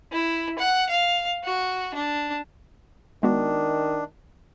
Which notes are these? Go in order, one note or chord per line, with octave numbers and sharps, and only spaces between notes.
E4
F#5
F5
F#4
D4
D#3 G#3 B3 D4 F#4